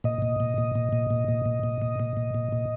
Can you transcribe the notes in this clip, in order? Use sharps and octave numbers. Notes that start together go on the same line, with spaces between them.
A#2 D#5
A#2
A#2
A#2
A#2
A#2
A#2
A#2
A#2
A#2
A#2
A#2
A#2
A#2
A#2